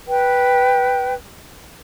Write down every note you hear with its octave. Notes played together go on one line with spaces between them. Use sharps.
B4 G5